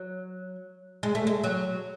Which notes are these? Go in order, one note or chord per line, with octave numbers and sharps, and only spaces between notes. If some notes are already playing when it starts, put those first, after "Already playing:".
Already playing: F#3
G#3
A3
G#3
F#3